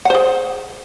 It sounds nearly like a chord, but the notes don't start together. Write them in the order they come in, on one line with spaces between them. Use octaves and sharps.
F#5 C5 G#4